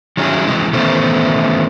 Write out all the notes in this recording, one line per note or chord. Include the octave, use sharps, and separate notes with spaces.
D#3 F#3 G3 C#4 E4 G#4
C3 E3 G#3
D#3 E3 A3 B3 C#4 C5